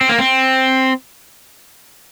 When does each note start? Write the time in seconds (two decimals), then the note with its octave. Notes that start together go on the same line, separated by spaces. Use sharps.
0.01 C4
0.09 A#3
0.18 C4